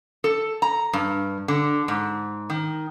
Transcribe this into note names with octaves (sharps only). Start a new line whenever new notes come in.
A4
A#5
G2
D3
G#2
D#3